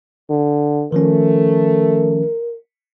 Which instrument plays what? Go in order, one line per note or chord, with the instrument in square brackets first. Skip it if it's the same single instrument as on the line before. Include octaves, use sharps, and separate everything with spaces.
[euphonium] D3
[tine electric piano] D#3 F3 C#4 [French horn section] A3 [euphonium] A#4